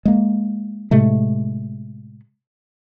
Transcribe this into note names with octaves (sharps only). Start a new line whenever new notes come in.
G#3 A#3
A2 C3 G#3 A3